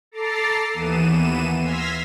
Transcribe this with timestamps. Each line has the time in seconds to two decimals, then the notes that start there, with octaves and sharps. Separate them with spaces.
0.12 A4 A#5 D6 A6 C7
0.73 D#2 E3 B3 D#7 E7
1.58 C6 E6 F6 G#6 A#6 B6